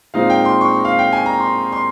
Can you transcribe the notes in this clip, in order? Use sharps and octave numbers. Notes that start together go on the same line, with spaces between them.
A#2 G#3 C4 D#4 F5
G5
C6
C#6
F5
G5
G#5
A#5
C6
C6